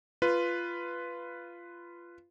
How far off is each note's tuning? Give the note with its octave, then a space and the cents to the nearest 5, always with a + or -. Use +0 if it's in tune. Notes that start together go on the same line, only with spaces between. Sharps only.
F4 -15 B4 +0